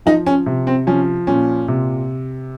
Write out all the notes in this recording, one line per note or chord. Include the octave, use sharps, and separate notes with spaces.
F3 D#4
C#4
C3
C4
F3 C#4
A#2 C#4
C3